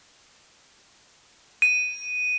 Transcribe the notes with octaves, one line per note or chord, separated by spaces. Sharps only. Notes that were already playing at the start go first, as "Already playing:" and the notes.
D#7